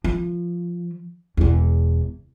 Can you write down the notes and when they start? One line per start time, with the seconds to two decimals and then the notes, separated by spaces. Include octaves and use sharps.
0.04 F3
1.37 E1 E2